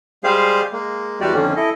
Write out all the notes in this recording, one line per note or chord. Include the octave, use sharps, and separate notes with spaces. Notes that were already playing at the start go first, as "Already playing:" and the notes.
G3 G#3 G4 G#4 C5 F5
G#3 A#3
E2 G3 G#3 F#4 G4 D5
F2 D3 D#3 A#3 C#4
E4 A4 D#5